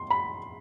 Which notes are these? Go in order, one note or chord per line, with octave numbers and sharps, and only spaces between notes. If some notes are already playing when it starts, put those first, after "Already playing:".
Already playing: C6
B5